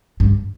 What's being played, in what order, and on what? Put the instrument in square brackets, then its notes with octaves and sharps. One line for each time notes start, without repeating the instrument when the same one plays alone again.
[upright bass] G2